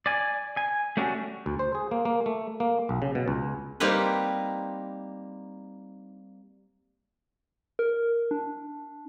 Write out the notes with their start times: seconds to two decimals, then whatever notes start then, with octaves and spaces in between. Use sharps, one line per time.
0.06 D5 G#5
0.57 G#5
0.97 A3 C#4 D4 F#4 G4
1.46 D2
1.59 C5
1.75 G#4
1.91 A#3
2.05 A#3
2.26 A3
2.60 A#3
2.89 B1
3.02 C#3
3.15 B2
3.28 C#2
3.80 G3 A#3 C4 D#4 B4
7.79 A#4
8.31 D4